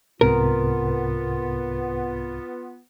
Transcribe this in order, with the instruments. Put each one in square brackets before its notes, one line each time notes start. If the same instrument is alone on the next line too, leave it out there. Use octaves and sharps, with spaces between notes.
[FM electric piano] C2 G#2 C3 [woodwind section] B3 F4 [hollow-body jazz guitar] A#4